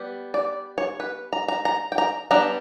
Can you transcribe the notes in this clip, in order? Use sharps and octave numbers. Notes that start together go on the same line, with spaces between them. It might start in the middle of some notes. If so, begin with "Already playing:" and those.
Already playing: G3 B3
D5
C#5
B4
A#5
A#5
A#5
G5
A#5
G3 B3 D4 A#5